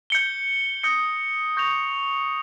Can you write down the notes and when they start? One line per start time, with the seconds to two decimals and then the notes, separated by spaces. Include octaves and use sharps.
0.10 G6 C#7 G7
0.83 D#6 G6 A#6 C#7 G7
1.57 C#6 G6 A#6 F7